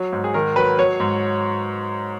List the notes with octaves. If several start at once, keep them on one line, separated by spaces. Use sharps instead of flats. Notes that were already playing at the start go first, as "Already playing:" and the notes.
Already playing: F#3
G#2
G#4
D#3 A#4
F#3 B4
F#3 C#5
G#2